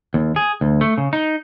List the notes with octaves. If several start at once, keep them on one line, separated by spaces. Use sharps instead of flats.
D#2
G#4
D2
A3
C#3
D#4